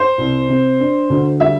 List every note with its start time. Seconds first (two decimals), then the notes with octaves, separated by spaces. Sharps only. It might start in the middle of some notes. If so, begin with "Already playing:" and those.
Already playing: C5
0.18 C2
0.49 C3
0.80 D4
1.10 D2
1.40 G3 E5